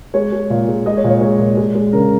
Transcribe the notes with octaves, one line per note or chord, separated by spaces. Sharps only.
G#3 C#5
G#3
A#2
G#3
G#3 D#5
C#5
A#2
C#5
G#3 C#5
A#2
G#3
G#3
C#3 A#4